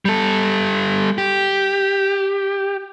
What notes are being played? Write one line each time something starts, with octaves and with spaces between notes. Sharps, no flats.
G3 A4
G4